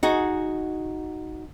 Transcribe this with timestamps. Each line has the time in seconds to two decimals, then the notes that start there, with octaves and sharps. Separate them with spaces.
0.03 D#4 F#4 G#4